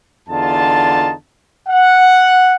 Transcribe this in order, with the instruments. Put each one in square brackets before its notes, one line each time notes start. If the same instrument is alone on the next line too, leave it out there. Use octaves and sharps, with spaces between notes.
[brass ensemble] E2 D3 D#4 F4 A5
F#5